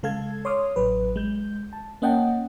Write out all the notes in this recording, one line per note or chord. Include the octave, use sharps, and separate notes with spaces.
C#3 G#3 A4 F5 A5 G#6
C#5 C6 D6 D#6 F6
A1 F#3 B4
G#3 G6
A5
A#3 C#4 D#5 F#5 G5 A5